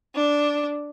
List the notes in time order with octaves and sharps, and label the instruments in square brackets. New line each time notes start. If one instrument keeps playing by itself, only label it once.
[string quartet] D4